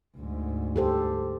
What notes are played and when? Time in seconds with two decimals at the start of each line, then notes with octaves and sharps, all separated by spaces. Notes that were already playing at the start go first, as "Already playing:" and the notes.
0.17 D2 G#2
0.76 G4 A4 C5